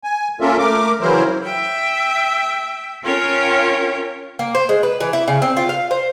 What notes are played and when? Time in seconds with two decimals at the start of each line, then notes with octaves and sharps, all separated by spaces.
0.04 G#5
0.40 A#3 C#4 F4 A4 A#4 E5
0.59 A3 A#4 D6
1.01 C#3 E3 F#3 E4 A#4 C5
1.43 E5 G5
3.03 C#4 F4 A#4 C#5 G5
4.39 A#3
4.55 C5
4.69 G#3
4.83 B4
5.00 E3
5.13 E4
5.28 C#3
5.42 C4
5.57 F4
5.69 F5
5.91 C5